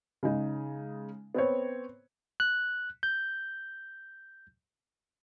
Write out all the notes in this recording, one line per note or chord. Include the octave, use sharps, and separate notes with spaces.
C#3 G#3 D#4
B3 C4 C5 C#5
F#6
G6